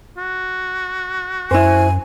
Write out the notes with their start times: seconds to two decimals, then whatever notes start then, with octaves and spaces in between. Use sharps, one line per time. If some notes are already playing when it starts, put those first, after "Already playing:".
0.17 F#4
1.51 F#2 E4 C5 G#5